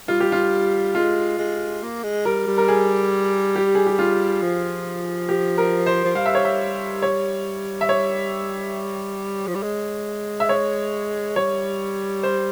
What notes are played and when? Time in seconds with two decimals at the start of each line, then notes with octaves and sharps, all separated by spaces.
0.08 G3 F4
0.20 G4
0.32 F4
0.95 G#3 F4
1.39 G#3
1.82 A#3
2.03 G#3
2.25 G3 A#4
2.47 G3
2.58 A#4
2.68 G#4
3.56 G4
3.75 G#4
3.87 G4
3.99 F4
4.42 F3
5.29 G4
5.58 A#4
5.86 C5
6.05 F3
6.15 G3 F5
6.26 E5
6.35 C#5
6.45 E5
7.02 C#5
7.81 E5
7.89 C#5
9.47 F3
9.55 G3
9.63 G#3
10.40 E5
10.49 C#5
11.36 G3 C#5
12.23 C5